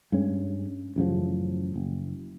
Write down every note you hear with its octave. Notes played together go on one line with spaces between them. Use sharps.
G2 G#3 C#4
A1 F#2 C#3 F3
F#1